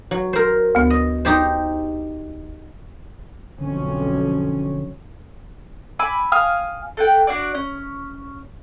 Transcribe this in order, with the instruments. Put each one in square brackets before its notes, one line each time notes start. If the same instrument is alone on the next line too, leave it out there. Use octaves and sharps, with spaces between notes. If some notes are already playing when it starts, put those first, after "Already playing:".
[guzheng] F#3
A#4 C5
[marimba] D2 B3
[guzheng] D#5
D#4 G4 C5
[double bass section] B1 F2 C#4 [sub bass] D3
[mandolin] G#5 B5 D6 E6
F5 G#5 D#6 F6
A4 F#5 G5
D4 F#4 D5
C#4